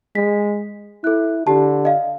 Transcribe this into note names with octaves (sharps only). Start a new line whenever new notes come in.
G#3 B6
E4 A4 F#6
D3 G4 A5
D#5 F5